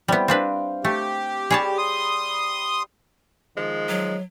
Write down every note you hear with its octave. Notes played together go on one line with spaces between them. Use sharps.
G3 B3 C4 E4 G5
C4 D4 B4 F5
A3 G4
G3 G#4 B4 C#5 A5
C6 D#6
D#3 F3 G#3
F#3